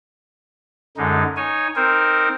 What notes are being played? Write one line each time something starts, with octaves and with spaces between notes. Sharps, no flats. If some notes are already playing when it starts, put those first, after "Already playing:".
F#2 D3 G#3 D#4
D#4 C#5 G#5
C4 D#4 A#4 C5